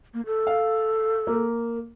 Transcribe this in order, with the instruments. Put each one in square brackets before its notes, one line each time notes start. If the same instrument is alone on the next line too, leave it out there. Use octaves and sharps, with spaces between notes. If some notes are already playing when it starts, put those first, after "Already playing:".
[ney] A#3
A4
[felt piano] F5
A#3